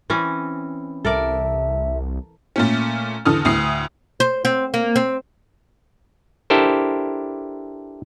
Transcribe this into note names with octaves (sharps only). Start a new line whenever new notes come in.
E3 C4 C#4
C2 A4 A#4 D5 E5
A#2 A3 C#4
E2 D3 A4 D#6 F6
D2 A2 D#6 C7
C5
C4
A#3
C4
D4 E4 G4 A4 A#4 C5